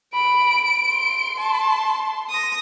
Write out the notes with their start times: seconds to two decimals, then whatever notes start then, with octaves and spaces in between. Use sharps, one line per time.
0.14 B5 D7
0.91 C6
1.38 A5
2.30 D#6 A#6